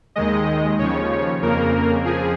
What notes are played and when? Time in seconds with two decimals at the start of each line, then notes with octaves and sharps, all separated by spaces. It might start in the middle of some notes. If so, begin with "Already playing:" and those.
0.16 D#2 D#3 G#3 D#5
0.78 D#2 C#3 F3 C#5
1.42 F2 C#3 A#3 A#4
2.05 F2 F3 G#4